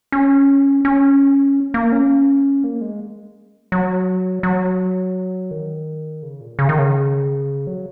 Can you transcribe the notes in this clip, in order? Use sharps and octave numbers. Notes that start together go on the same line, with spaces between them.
C#4
C#4
A#3
C#4
A#3
G#3
F#3
F#3
D#3
C#3
A#2
C#3
D#3
C#3
F#3